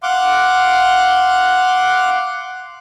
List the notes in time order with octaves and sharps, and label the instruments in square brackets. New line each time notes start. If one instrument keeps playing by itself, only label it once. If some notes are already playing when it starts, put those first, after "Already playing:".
[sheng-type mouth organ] F5 F#5 C6 D6